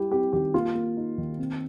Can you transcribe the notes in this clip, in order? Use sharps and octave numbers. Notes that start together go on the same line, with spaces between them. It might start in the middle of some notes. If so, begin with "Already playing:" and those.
Already playing: G3 E4 G4
C4 G4
D#3 G4
A#3 F4
A#3
D#4
D#3
C4